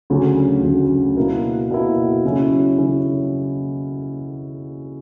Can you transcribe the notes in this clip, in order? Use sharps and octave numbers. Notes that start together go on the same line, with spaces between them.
D2 C#3 F#3
D2 C#3 F#3
B2 A#3 E4
B2 A#3 E4
C#3 F#3 C#4 E4
C#3 F#3 C#4 E4